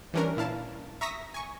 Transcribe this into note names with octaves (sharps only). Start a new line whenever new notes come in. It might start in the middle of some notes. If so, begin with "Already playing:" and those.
E3 G3 C#4 D4 A#4
A#2 E4 F5 A5
E5 A#5 C#6 D#6 A#6 B6
G#5 C#6